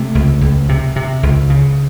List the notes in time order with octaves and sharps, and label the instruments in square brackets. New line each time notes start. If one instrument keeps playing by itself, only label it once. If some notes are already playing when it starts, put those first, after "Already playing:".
Already playing: [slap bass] C3 A3
C#2
C#2
C3
C3
C#2
C#3